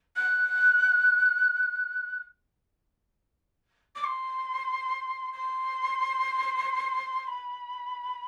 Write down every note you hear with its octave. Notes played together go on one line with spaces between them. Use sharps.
F#6
D6
C6
C6
B5